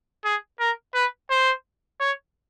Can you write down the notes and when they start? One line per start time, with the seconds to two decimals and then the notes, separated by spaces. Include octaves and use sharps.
0.24 G#4
0.60 A#4
0.94 B4
1.30 C5
2.00 C#5